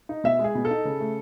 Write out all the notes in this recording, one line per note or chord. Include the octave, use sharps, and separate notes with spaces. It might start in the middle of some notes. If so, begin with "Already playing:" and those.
D#4
B2 E5
G#3
G#4
B2
A4
D#4
C#3
A3